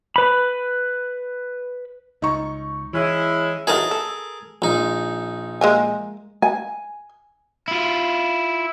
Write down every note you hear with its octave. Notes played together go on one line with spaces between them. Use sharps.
B4 B5
C#2 D#4 C#6
E3 G#3 C#4 E4
D#3 E3 F#3 G#4 A#4 A5
A4
A#1 D#4
G#3 A#3 G#5
G#5
E4 F4